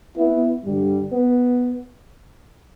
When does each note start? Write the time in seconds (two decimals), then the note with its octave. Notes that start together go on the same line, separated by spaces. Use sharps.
0.17 B3 E4
0.64 G2 D3 G3
1.12 B3